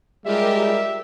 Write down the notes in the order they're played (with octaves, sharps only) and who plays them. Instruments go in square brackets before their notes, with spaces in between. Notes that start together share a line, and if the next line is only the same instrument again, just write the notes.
[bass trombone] G3 [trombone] G#3 [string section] F4 G4 A#4 [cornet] E5